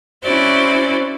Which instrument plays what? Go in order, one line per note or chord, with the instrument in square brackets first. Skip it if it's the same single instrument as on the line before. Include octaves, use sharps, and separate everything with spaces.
[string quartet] C4 C#4 E4 F#4 C5 D5